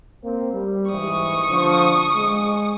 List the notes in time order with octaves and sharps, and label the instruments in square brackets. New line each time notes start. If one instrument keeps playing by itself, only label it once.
[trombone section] A#3 C4
G3
[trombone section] G#2 E3 [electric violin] C#6 D#6
[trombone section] D3 F3
G#3